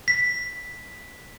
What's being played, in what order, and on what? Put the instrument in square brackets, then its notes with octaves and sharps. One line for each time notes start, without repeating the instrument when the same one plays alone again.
[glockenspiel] B6